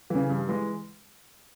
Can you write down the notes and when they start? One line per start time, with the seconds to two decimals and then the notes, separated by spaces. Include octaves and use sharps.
0.10 C#3 E3
0.29 G2
0.49 E3 G#3